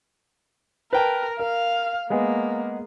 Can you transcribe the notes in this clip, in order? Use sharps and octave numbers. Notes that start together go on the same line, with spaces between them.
A#4 B4 G5 A5
A#4 F5
G#3 A#3 B3 G#4